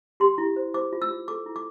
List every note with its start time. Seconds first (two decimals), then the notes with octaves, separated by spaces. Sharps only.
0.20 G4 C6
0.38 E4
0.56 C5
0.74 C5 D6
0.93 F4
1.02 E6
1.10 F4
1.28 A4 D6
1.46 E4
1.56 D6